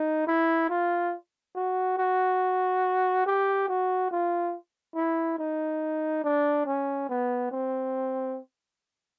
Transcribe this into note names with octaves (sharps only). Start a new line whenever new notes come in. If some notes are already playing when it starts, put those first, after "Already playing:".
Already playing: D#4
E4
F4
F#4
F#4
G4
F#4
F4
E4
D#4
D4
C#4
B3
C4